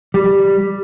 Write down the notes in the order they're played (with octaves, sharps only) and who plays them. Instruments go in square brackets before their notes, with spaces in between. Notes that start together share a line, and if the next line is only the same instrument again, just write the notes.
[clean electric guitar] G3